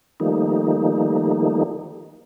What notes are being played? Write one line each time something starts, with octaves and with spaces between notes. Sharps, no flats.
D#3 F3 G3 A3 A#3 D#4